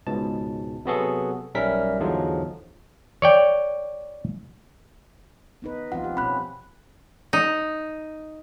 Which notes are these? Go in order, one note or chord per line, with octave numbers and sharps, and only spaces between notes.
C#2 G#2 B2 A5
C3 F#3 B3 F#4 G#4 A4
B1 G3 C#4 A#4 E5 B6
E2 G#2 D3 F3 F#3 G#3
C#5 D5 G5
B3 D#4 B4
F3 C4 F4 F#5
G4
B2 C4 C#4 B5 F#6
D#4